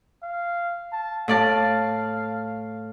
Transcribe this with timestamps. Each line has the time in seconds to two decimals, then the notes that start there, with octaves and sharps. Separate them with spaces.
0.23 F5
0.93 A5
1.28 A2 D5 F5 A5